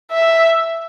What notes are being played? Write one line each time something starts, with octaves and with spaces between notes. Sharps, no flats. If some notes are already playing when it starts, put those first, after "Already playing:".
E5